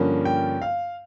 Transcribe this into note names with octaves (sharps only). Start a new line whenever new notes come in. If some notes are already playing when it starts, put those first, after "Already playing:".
Already playing: G2 D3 F3 A#3 C#4
G5
F5